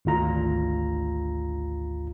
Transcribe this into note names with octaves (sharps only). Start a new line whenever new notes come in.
G#1 D2 F4 A#5